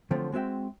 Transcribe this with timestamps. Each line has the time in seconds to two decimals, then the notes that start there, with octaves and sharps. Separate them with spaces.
0.11 D3 F3 F#3 A3 C4 F4
0.32 G#3 C4 F#4 E5 G5